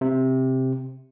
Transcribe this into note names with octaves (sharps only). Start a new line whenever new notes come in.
C3